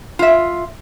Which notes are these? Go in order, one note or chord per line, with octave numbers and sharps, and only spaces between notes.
F4 E5